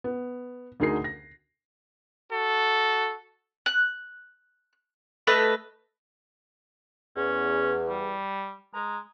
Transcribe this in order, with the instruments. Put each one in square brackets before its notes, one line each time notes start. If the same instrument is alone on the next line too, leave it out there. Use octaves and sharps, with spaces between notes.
[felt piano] B3
D2 D3 D#4 G#4 A#4 C7
A#6
[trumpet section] F#4 A4
[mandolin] F#6
A3 B4 D#5
[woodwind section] E2 [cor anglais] C#4
[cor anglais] G3
[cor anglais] G#3 [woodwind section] A#5